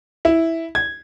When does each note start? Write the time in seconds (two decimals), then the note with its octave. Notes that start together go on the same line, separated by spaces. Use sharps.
0.25 E4
0.75 G#6